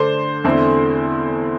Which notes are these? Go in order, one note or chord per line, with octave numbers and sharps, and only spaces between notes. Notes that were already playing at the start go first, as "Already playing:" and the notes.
Already playing: D3 A3 D4 C5
E2 D3 A3 C4 E4